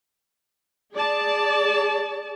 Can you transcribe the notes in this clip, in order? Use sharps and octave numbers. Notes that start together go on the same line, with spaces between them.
G#4 D5 A5